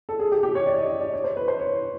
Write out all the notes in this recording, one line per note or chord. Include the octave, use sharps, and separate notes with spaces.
A4
G#4
G4
G4
C#5
D5
D#5
D#5
D5
C#5
C5
B4
C5
C#5